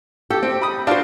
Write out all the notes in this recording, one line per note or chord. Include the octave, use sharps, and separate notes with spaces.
G4 A4
C4
B5 D#6
D4 F4 F#4 C5 A5